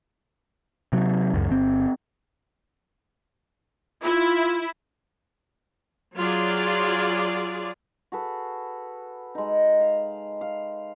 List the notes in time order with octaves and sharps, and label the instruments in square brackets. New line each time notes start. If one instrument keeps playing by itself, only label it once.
[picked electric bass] C3 F#3
C#2 F#2
G1 C4
[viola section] E4 [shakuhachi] F4
[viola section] F#3 F4 G#4 D5
[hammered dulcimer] F#4 G#4 A4 B4
G#3 D#4
F5
F5